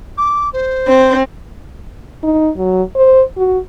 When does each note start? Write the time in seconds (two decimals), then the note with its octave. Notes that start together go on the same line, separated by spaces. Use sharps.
0.17 D6
0.53 C5
0.87 C4
2.23 D#4
2.57 F#3
2.95 C5
3.37 F#4